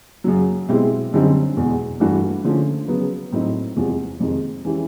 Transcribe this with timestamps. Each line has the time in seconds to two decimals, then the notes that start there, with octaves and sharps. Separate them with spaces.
0.24 F#2 C#3 F#3
0.68 B2 G#3 C4 E4 G4
1.13 F#2 D3 G3 C4 D#4
1.57 E2 B2 G#3
2.00 G2 E3 A3 D4 F#4
2.44 D3 F3 A3 C#4 F4
2.88 C#3 F#3 B3
3.32 A2 F#3 A3 C4 D#4
3.77 E2 C3 F3 G#3
4.20 F2 C3 D#3 G#3
4.65 E3 G#3 C#4 E4 G4